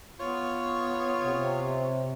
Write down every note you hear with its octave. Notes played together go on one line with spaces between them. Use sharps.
B3 F4 C#5
C3